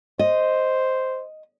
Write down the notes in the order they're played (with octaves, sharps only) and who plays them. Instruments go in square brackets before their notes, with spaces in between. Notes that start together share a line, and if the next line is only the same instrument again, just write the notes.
[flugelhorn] C5 [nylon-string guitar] D#5